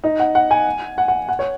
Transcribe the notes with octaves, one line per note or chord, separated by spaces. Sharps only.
D#4
F#5
F#5
G#5
F#5
F#5
F#5
C#5